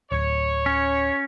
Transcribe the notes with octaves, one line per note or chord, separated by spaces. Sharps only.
D1 C#5
C#4